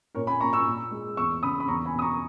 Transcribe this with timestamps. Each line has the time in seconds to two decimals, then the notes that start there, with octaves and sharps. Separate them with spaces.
0.15 A#2 A#4 C#5
0.27 G#5 B5
0.40 A#3 A#5 C#6
0.53 C#6 E6
0.66 A#2
0.91 G#3
1.17 E2 C#6 E6
1.43 C#3 B5 D#6
1.60 B5
1.68 E2 A#5 C#6
1.86 G#5 B5
1.94 B2 D#6
2.02 A#5 C#6